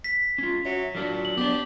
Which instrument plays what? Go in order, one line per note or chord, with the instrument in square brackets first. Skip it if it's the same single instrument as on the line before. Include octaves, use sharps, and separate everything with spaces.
[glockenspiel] B6
[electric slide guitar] C#4 F4
[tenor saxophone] F#3 [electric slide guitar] E5
[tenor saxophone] A#2 [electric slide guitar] F#3 D4 F#4
[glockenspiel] F#7
[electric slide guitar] B3 D4 [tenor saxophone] G4